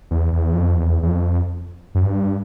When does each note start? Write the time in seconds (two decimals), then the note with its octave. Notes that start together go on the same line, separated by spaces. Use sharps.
0.11 E2
0.33 E2
0.54 F2
0.75 E2
1.03 E2
1.07 F2
1.95 F#2
2.03 G2